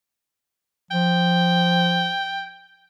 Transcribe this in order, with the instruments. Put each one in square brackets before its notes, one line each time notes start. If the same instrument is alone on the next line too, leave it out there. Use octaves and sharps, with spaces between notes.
[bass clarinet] F3 [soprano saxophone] G5